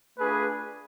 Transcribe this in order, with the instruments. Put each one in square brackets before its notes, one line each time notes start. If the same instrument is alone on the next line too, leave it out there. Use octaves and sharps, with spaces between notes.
[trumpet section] A3 D4 F4 G#4 B4